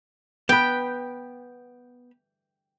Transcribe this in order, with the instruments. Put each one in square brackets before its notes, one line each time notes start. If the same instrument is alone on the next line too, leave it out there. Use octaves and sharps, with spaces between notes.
[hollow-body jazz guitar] B3 B4 [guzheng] G5